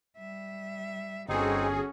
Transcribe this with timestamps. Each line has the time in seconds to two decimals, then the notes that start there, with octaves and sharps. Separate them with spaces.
0.18 G3 E5
1.29 G1 C4 C#4 D#4 F#4 G#4 A4